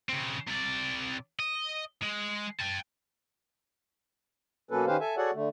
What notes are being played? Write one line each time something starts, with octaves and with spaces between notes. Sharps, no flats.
C#3 C4
C3 D5
D#5
G#3
G5 A5
B2 F#3 A#3 C#4 A4 B4
D#3 C#4 G4 B4 C5 F5
A4 E5 G#5
F#4 G#4 A4 C#5 D5 F#5
D3 A3